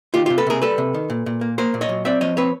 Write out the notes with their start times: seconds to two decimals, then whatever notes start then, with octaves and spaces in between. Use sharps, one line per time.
0.14 D#3 F4 G4
0.26 C3 F4 G4
0.38 A4 B4
0.47 C3 G#4 A#4
0.62 G3 A4 B4
0.78 C3
0.94 D#3
1.10 A#2
1.26 A#2
1.41 A#3
1.58 A#3 A#4 C5
1.74 A#2
1.81 C#5 D#5
1.89 F#3
2.05 C4 D5 E5
2.21 F3 C#5 D#5
2.37 C4 B4 C#5